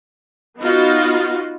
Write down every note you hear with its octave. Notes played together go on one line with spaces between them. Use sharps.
B3 D#4 F4 F#4